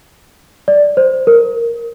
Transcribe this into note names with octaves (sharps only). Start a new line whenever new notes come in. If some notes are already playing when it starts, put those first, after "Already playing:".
D5
C5
A#4